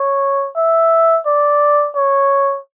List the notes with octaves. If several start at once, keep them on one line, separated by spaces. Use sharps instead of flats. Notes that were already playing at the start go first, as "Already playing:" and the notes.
Already playing: C#5
E5
D5
C#5